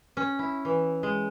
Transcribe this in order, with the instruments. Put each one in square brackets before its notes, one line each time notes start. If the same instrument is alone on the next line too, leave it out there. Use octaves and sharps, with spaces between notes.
[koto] C#4
E4
E3
G#3